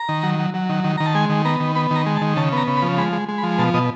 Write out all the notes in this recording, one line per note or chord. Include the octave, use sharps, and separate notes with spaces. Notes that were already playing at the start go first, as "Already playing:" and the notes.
Already playing: A#5
D#3
F#3
F#3
F#3
D#3
D#3
D#3 A#5
A5
G#3 G#5
D#3
B3 A#5
D#3
B3 B5
D#3 A#5
G#3
A5
D#3
C#3 A5
B3 A#5
C#3
B5
F3
G#3 B5
G#3
G#3
B5
F3
B2 A5
B2 D#5